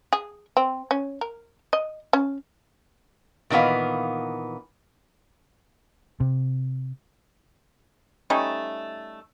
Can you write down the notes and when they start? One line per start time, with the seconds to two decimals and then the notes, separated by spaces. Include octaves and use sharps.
0.13 G#4
0.57 C4
0.91 C#4
1.21 A#4
1.73 D#5
2.13 C#4
3.50 A#2 D#3 E3 B3 F5
6.20 C3
8.30 G3 A3 C#4 D#4